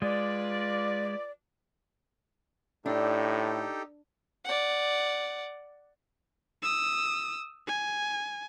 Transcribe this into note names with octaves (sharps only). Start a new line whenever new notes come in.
G#3 F4 B4 D5
A2 D4 D#4 G4 A4
D5 F#5
D#6 E6
G#5